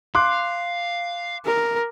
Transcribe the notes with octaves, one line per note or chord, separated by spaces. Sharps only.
F5 C6 D6 F#6
A#4